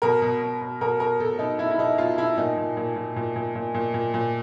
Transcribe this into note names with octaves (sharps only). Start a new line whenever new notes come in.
B2 A#4
B2
B2
B2
B2 A#4
B2 A#4
B2 A4
B2 D#4
B2 E4
E4
B2 D#4
B2 F4
B2 E4
A#2 D#4
A#2
A#2
A#2
A#2
A#2
A#2
A#2
A#2
A#2